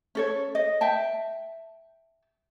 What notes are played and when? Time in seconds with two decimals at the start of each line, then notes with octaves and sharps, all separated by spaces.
0.15 C#4 A4 C#5
0.55 D#5
0.81 E5 G5 A5